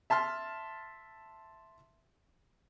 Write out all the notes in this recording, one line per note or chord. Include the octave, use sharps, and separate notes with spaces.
E5 A5 C6 F6